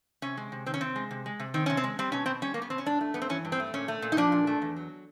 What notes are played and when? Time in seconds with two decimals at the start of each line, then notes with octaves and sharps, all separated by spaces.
0.22 C3 C#4
0.37 G#3
0.52 C3
0.66 D#3 C4
0.74 C#4
0.81 C3 C4
0.96 G#3
1.11 C3
1.26 G#3
1.40 C3
1.54 D#3 C4
1.66 C3 C#4
1.77 C4
1.84 G#3
1.99 G3 C4
2.12 B2 C#4
2.26 B2 C4
2.42 G3 C#4
2.54 A#3
2.57 G3 B3
2.70 B2 C4
2.78 C#4
2.86 G2 D4
3.01 A3
3.14 G2 B3
3.22 C4
3.29 E3 C#4
3.45 G2
3.52 C4
3.60 A3
3.74 A#2 C#4
3.88 A3
4.02 A#2
4.12 D#4
4.17 F3 D4
4.32 A#2
4.47 A3
4.62 E2
4.76 F#3